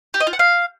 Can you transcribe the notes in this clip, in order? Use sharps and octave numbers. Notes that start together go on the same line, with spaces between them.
G4
D#5
F4
F#5
F5